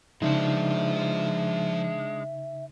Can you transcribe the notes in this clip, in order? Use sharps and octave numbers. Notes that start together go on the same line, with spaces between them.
C#3 F3 G#3 D4 D#4 C5 E5